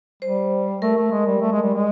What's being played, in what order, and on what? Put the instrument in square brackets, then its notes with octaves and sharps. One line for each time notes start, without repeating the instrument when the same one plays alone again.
[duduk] G3 [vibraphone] C5
[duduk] A3 [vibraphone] A#4
[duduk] A3
G#3
G3
A3
G#3
G3
G#3